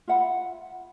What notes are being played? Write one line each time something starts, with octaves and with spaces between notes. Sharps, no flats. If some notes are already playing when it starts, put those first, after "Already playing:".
F4 E5 F#5 B5